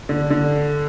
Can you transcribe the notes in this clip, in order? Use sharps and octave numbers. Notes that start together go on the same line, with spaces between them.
D3
D3